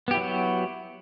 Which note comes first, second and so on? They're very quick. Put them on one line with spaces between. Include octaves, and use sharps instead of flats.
B3 G4 E4 F#3 F#4